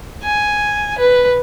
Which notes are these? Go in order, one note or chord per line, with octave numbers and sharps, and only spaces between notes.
G#5
B4